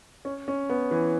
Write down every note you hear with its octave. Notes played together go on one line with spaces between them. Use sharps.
C#4
C#4
B3
E3